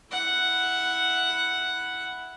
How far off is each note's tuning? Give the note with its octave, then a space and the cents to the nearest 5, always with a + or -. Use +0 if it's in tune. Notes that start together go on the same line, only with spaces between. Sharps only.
E4 +0 F#5 +0